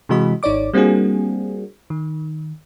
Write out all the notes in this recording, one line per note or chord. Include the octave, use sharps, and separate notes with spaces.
C3 E3 G#3 F#4 D#5 B5
G#1 D#4 C#5 D5 D6
G3 A#3 C4 D4 F#4 G#4
D#3